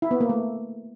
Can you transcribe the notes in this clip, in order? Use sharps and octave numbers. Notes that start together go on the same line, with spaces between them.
E4
B3
A#3
A3